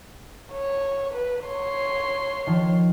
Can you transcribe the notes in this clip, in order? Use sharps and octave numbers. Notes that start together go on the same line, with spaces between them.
C#5
B4
C#5 C6
D#3 F3